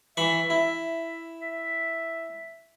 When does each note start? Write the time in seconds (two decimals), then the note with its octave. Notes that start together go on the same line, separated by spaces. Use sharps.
0.17 E3 E5 B5 C#6
0.50 E4
1.41 E5